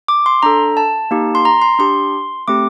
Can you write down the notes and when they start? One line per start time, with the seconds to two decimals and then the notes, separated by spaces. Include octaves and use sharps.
0.08 D6
0.26 C6
0.43 D4 A4 A#5
0.77 A5
1.11 A#3 D#4 G4
1.35 C6
1.45 A#5
1.62 C6
1.79 D4 G4 C6
2.48 A3 C4 G4 D6